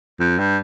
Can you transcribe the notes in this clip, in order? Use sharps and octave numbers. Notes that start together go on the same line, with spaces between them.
F2
G2